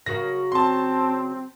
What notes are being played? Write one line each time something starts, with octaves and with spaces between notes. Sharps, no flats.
C#3 F#3 F#4 A#4 A#6
C4 A5 C6